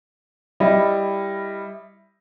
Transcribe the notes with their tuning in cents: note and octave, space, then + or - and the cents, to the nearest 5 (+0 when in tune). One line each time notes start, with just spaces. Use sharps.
G3 +10 E4 +0 D#5 +0